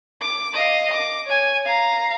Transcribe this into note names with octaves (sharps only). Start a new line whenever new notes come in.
D6
D#5 F5
D6
C#5 G#5
F5 A#5